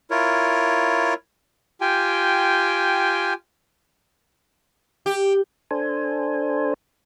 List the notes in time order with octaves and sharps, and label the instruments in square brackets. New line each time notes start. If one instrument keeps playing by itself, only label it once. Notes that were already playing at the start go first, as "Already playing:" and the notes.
[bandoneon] E4 F4 A#4 C#5
[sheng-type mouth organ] F4 G4 G5 G#5
[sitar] G4
[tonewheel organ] D4 A4 C5 G#5